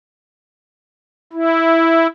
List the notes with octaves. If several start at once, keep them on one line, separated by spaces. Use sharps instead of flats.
E4